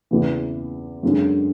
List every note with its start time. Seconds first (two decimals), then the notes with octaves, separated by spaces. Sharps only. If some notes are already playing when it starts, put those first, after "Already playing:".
0.11 E2 C#3 E3
1.03 F#2 D3 G#3 C#4